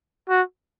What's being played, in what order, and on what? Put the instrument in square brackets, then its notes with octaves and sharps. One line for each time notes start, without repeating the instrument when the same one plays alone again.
[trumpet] F#4